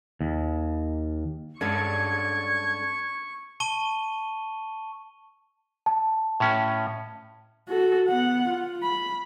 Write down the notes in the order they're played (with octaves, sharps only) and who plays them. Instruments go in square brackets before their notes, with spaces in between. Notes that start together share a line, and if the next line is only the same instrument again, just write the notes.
[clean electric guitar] D#2
[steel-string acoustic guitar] G2 G#3 [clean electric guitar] C#4 D4 A4 [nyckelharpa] C#6 [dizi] G#6
[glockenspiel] A5 C#6 D#7 G7
[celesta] A5
[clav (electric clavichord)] A2 C#4
[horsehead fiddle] F#4 A4
B3 F#5
F4
B5